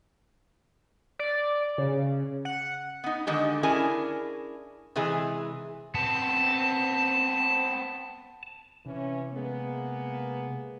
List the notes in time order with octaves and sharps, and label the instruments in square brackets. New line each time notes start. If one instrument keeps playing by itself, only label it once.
[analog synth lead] D5
C#3
F#5
[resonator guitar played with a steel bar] B3 D#4
D3 D#3 G#3 G4
C#4 D4 E4 G#4 A#4 G#5
C3 E3 G#3 G#4
[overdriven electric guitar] B3 C4 [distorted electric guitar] A5
[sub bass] C3 [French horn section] E3 C#4
[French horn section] G#3 A#3 B3